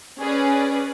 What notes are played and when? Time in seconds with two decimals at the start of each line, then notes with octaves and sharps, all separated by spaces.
0.19 C#4 G#4 B4 D5